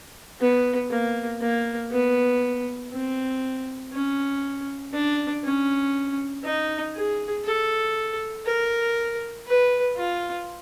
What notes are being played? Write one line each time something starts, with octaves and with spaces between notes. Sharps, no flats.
B3
A#3
A#3
B3
C4
C#4
D4
C#4
D#4
G#4
A4
A#4
B4
F4